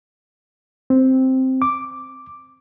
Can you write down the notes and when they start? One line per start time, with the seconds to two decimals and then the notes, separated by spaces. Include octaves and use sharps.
0.90 C4
1.62 D6